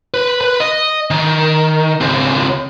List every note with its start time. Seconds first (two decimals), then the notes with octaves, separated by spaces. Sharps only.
0.14 B4
0.41 B4
0.60 D#5
1.11 D#3
2.01 C#2 C4